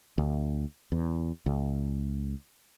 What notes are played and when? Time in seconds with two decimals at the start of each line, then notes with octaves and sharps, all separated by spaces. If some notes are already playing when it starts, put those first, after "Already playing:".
0.18 D2
0.92 E2
1.46 C#2